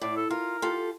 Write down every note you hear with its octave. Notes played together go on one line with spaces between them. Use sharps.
A2 D5
A4
F4 A#4
F4 G4 A4